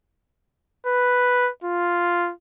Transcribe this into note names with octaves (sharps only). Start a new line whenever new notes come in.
B4
F4